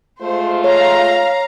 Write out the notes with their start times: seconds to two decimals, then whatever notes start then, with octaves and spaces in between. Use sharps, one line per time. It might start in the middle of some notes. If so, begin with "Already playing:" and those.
0.22 G#3 A3 F4 C5
0.64 C#5 F5 A#5